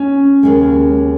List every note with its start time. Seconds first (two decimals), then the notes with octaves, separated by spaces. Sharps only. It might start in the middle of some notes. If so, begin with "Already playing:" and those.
Already playing: C#4
0.43 D#2 C#3 G#3